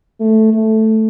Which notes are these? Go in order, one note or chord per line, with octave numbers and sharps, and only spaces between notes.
A3
A3